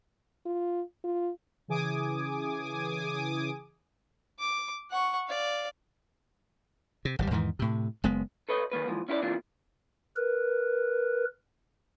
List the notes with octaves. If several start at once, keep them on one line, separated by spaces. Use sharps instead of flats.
F4
F4
C#3 E3 G#4 G#5 D6 D#6
D6
F#5 C#6
D5 F5
C3
G#1 D3 G3
E2 G#2 D#3 E3
A2 C3
F#1 G#3 B3
A4 B4 C#5 D#5
D#3 A#3 B4
D#2 G#2 E3 F3
C#4 E4 G4 B4 D5
C3 E3 A#3 D4 F4 G4
A#4 B4